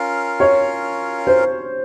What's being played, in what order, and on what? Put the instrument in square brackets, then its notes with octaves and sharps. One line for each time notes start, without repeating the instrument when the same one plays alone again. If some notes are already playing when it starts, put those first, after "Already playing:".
Already playing: [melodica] C#4 F4 A#4 F5
[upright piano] C#5
C5